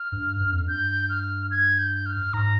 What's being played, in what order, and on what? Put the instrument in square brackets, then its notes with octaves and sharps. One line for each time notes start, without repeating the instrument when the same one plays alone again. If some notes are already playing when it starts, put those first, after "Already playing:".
Already playing: [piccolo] F6
[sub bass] G2
G2
F2
[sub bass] G2 [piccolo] G6
[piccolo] F6
G#6
G6
F6
[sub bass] G#2 [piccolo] A#5